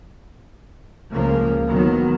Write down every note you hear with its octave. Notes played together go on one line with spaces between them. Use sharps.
C#2 C#3 F3 A#3
D#3 F#3 B3